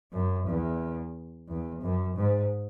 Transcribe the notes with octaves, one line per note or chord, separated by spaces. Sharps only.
F#2
E2
E2
F#2
G#2